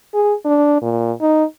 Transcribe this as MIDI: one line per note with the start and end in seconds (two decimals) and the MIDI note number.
0.14 0.33 68
0.45 0.79 62
0.82 1.12 46
1.21 1.44 63